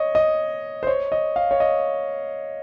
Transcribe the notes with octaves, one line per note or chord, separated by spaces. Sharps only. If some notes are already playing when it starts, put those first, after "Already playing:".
Already playing: C#5 D#5
D#5
C5
C#5
D#5
F5
C#5
D#5